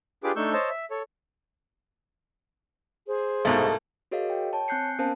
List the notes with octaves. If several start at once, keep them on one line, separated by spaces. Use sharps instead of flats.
D4 F4 G4 G#4 B4 D6
A3 D4 D#4 C#6 E6 G6
C5 C#5 D#5 A5 E6
E5
A4 C#5
G#4 C5
C2 G#2 B2 A3 A#3
F#4 G#4 A#4 C#5 D#5 F5
G5
C#5 A5
C4 G#5 F#6 G6 C7 C#7
B3 C#4 A#4 C5 F5 A5